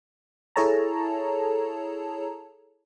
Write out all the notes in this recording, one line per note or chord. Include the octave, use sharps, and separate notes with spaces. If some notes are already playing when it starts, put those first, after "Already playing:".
E4 G#4 A4 C#5 A5 A#5